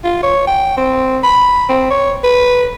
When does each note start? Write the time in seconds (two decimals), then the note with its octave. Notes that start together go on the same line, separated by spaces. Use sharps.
0.04 F4
0.23 C#5
0.47 G5
0.77 C4
1.23 B5
1.69 C4
1.91 C#5
2.24 B4